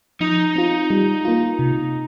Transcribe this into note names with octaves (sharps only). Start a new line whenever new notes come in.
F3 D#4
C4 F4
G3
A#3 F4
C3